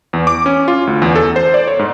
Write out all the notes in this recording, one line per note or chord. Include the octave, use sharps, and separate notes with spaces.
E2
D6
C#4
F4
D2
E2
A4
C5
D5
C#5
G#2